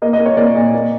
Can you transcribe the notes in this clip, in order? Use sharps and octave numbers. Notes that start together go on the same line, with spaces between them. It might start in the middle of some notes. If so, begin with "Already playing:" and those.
A#3 D#5
D#5
A#3
C#5
A#3 D5
A#2 D#5
A#3